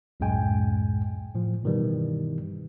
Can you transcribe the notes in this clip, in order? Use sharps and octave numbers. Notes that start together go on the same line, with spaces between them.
C#2 F#2 A2 G#3 G5 G#5
A2 F3
G2 B2 D#3 E3 G3